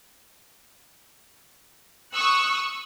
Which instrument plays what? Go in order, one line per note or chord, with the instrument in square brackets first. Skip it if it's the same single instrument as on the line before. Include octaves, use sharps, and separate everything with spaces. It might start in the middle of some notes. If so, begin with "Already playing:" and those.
[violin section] C#6 D#6 E6 F#6 C#7